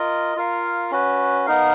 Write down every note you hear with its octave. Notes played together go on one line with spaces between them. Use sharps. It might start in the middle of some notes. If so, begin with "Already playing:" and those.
Already playing: F4 A#4 D#5
F4 A#4 F5
C#4 F#4 B4
B3 D#4 A#4 F5